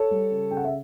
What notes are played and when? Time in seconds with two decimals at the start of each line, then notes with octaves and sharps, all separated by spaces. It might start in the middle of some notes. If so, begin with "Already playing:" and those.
Already playing: A4 C#5
0.11 G3
0.31 C#3
0.51 C#3 G5
0.57 F#5
0.65 E5